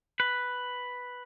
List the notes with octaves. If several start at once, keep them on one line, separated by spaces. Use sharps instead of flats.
B4